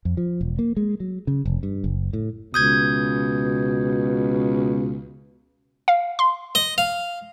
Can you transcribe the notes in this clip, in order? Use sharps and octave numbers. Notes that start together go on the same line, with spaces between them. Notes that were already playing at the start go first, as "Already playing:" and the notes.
F2
F3
E1
A#3
G#3
F#3
C#3
F1
G2
F#1
A2
C#2 B2 D#6 G6 G#6
F5
C6
D#5
F5